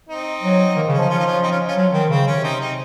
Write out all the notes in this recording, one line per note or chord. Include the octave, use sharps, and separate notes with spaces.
C4 D#4
F#3
D#3 A#3
C4
C#3
C#4
F3 D#4
C#4 F4
D#4
C#4 F4
C4 D#4
C#4 F4
C#4 F4
F#3
D#3 C4
C#3 C4
C3 C#4
C4 D#4
C4 D#4